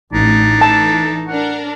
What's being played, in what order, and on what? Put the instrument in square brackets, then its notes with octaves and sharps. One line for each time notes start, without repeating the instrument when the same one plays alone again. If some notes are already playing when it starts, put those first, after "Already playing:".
[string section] A1 [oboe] D4 [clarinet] D#4
[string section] E3 A4 [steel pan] A5
[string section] D4 A#4 [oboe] F#5